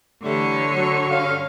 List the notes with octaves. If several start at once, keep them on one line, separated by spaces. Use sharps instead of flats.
D3 E3 G3 A3 C#5
F#3
G2 C#4 F5